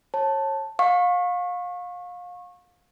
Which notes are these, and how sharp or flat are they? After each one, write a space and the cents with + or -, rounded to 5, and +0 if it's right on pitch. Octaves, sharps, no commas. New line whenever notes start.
C#5 -30 A5 +0
F5 +30 C#6 -25